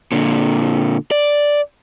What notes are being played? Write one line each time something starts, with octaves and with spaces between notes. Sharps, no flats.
A#2 D3
D5